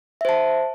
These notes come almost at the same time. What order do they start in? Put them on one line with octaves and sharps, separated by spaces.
E5 C5 A5